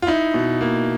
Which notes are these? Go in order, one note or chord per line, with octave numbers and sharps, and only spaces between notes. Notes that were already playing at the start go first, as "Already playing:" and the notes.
F4
D#4 E4
B2
A#3